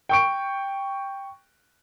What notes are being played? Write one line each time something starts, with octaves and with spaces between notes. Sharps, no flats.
G5 C#6 D7